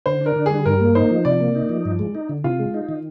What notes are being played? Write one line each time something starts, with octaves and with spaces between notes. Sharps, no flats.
D3 C5
D4
A#4
D3
G3 G#4
G2 A#4
A#3
D#4 C5
F3
C3 D5
A#3
D#4
F3
G2
G#3
D#4
D3
C3 F4
G#3
D#4
D#3